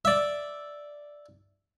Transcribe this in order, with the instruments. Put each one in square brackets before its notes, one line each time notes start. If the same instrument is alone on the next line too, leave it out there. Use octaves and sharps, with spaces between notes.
[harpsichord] D5 E5